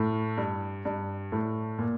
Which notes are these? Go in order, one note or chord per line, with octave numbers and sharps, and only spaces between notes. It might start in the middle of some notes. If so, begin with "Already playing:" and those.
Already playing: A2
G2
G2
A2
A#2